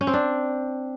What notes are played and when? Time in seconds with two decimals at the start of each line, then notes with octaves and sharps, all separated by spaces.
0.01 C#4
0.07 C4
0.13 D4